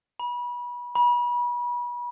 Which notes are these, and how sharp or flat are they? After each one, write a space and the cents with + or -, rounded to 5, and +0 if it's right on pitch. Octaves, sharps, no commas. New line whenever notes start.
B5 -30
B5 -35